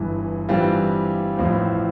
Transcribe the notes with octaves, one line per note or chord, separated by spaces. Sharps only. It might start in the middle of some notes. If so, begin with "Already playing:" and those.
Already playing: G1 G2 E3
G2 E3 G3 C4 F4
A1 A2 F3 C4